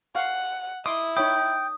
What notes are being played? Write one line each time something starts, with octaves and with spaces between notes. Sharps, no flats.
F5 F#5 C#6
E4 D#5 C6 D6 D#6
D#4 C#5 G5 B5 D#6